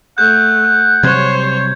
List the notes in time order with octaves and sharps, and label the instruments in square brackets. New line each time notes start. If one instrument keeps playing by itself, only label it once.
[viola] A3 [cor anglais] F#5 [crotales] G6
[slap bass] C3 F#3 G3 [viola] C5 C#5 [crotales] G#6